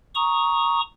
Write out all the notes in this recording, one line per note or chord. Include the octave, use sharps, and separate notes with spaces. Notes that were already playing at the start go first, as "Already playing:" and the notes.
A#5 C#6 D#6